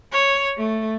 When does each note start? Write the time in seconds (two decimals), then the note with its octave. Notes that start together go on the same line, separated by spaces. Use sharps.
0.12 C#5
0.58 A3